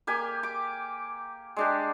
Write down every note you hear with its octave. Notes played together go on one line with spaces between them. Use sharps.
A#3 G4 G#5
D6
G#3 D4 G4